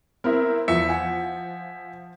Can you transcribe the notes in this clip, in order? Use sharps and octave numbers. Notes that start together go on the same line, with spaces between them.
B3 C4 E4 A#4
E2 F3 E5 C#7
F#5 G#5 B6